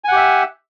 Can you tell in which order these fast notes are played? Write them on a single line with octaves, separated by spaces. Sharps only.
G#5 F#5 G4 E5